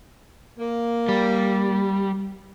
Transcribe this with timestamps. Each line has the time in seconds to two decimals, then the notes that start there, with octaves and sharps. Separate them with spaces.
0.59 A#3
1.09 G3